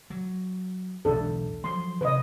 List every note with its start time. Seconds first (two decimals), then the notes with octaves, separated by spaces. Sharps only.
0.10 F#3
1.05 B1 E2 G#2 D4 A4
1.64 F3 F#3 C6
2.01 C3 B4 D#5